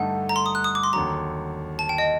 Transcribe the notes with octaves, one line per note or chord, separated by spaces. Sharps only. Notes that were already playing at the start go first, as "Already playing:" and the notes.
Already playing: G2 D3 A3 D#4 F#5
A#5
C6
D#6
F#6
D#6
D6
C6
D#2 D3 F#3 A#5
A5
G5
D#5